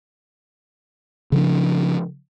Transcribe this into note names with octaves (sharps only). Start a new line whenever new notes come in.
C#3 F3 D4